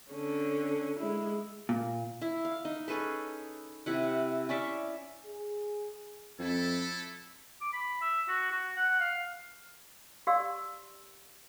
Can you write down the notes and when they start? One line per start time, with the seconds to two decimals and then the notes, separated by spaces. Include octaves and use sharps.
0.12 D3 C#4
1.00 G#3 E4
1.69 A#2
2.22 E4
2.45 F5
2.65 D#4
2.88 C#4 G#4 A4 B4
3.86 C3 E4 F#5
4.49 C#4 D5 E5 C#6
5.26 G#4
6.39 F2 A3 E4 A4
7.61 D6
7.73 B5
8.01 E5
8.29 F#4
8.52 F#4
8.76 F#5
9.00 F5
10.27 G4 D5 F5 C6 E6